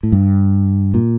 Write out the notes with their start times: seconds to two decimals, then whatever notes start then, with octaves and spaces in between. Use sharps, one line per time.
0.03 A2
0.12 G2
0.94 A#2